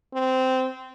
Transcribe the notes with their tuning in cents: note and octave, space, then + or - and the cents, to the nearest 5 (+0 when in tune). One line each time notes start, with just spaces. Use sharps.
C4 -15